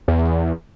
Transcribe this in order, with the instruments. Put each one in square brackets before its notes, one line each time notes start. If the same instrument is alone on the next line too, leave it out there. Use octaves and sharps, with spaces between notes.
[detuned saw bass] E2